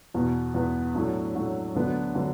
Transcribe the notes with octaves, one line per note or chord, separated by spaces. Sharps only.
E2 B2 B3
E2 B2 B3
A2 F#3 A3 D4 F#4
A2 F#3 A3 D4 F#4
D2 D3 F#3 B3 D4
D3 F#3 B3 D4